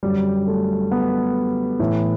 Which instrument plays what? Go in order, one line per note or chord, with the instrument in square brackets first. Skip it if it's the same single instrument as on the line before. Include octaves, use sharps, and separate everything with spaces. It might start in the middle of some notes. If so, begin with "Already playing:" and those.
[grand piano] F#2 D3 G3
A3
B3
A2 E3 E4